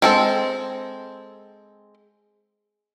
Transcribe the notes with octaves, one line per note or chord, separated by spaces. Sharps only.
G#3 C4 A4